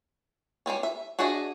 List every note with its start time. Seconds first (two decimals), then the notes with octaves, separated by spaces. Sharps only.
0.66 G3 G#3 C4 C#4
0.83 E5
1.19 D4 F#4 G#4 D#5 E5